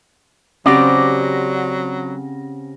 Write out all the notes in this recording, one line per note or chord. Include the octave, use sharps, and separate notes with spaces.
C#3 F#3 C4 C#4 G4 D5 F#5 A#6